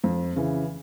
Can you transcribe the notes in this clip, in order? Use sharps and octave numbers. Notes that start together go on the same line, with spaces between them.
F2
C#3 E3